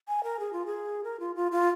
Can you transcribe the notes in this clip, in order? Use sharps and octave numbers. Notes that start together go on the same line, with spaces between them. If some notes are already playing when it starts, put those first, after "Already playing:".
G#5
A#4
G#4
F4
G#4
A#4
F4
F4
F4